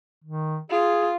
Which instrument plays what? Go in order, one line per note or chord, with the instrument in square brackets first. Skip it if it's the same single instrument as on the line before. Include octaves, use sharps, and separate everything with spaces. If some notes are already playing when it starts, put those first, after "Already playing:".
[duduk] D#3
[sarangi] F4 [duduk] G#4